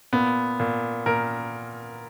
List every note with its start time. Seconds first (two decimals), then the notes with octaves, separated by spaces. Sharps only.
0.13 A#2 B3
0.60 A#2
1.06 A#2 A#4